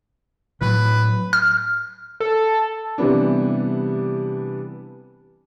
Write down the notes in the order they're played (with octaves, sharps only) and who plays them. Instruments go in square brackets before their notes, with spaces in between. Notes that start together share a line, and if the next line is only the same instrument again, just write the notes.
[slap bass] A2 F#3 [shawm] B4
[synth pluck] F6
[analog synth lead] A4
[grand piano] C3 E3 G3 B3 D4